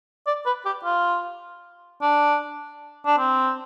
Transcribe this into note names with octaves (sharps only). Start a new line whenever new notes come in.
D5
B4
G4
F4
D4
D4
C4